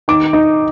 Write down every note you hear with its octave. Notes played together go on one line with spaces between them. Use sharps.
D#3 D6
D#4